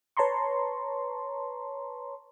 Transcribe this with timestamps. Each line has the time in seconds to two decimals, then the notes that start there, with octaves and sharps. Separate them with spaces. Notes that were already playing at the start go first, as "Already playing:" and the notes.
0.17 B4 C#5 A5 A#5 C6 C#6